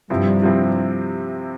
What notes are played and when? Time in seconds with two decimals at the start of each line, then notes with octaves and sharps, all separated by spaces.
0.10 G2 C3 F3 C4 E4
0.42 C3 F3 C4 E4